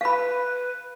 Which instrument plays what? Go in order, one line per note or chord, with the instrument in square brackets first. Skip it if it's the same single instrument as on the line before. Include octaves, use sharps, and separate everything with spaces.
[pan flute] B4 [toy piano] F5 B5